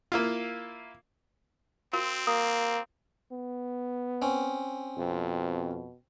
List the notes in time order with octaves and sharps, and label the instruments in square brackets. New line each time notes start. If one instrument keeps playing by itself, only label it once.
[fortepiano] A#3 E4 F4
[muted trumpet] C4 [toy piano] F#4 A#4 F5
[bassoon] A#3 [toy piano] D#6
[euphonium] B3
[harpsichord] C4 C#4
[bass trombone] F2 [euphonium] B2